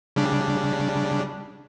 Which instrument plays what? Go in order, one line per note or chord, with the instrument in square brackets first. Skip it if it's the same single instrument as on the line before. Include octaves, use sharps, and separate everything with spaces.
[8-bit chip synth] C#3 G3 D4